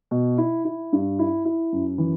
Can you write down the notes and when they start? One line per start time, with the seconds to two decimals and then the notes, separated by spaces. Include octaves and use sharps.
0.11 B2
0.38 E4
0.65 E4
0.93 G2
1.19 E4
1.45 E4
1.72 F#2
1.98 E3